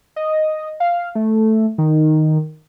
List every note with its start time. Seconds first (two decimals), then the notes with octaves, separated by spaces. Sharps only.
0.16 D#5
0.80 F5
1.15 A3
1.78 D#3